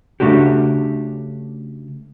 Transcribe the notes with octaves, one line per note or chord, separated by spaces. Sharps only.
C#3 F3 A3 D4 F#4 G4